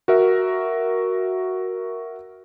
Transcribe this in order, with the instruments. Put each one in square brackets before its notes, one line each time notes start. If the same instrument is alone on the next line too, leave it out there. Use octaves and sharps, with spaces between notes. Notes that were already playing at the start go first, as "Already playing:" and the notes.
[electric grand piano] F#4 A#4 E5